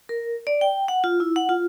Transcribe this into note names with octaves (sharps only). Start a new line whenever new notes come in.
A#4
D5
G5
F#5
F4
E4
F#5
F4